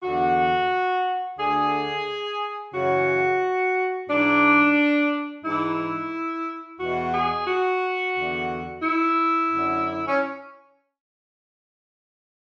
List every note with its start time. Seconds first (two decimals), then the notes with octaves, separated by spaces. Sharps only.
0.02 E2 D3 F#4
1.38 D2 D3 G#4
2.74 F#2 C#3 E3 F#4
4.08 G#2 E3 D4
5.44 G#2 E3 E4
6.79 E2 B2 F#4
7.13 G#4
7.47 F#4
8.15 E2 D3
8.82 E4
9.49 F#2
9.55 D3
10.07 C#4